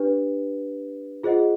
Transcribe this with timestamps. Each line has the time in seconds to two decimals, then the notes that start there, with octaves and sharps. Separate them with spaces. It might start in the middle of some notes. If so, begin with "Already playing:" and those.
Already playing: D4 G4 B4
1.23 F4 G#4 C5 D#5 F#5